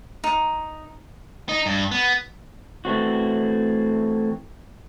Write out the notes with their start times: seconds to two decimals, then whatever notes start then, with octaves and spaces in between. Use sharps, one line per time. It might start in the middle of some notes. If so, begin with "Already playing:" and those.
0.24 D#4
1.49 D#4
1.66 G2
1.91 B3
2.85 E3 A3 C4 F#4